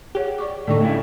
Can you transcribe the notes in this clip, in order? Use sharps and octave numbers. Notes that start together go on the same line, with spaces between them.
G4 G#4 C#5 F#5
D5 C#6 D6
A2 D3 A3 D#4 D5 G5 C#6
C#3 A3 E4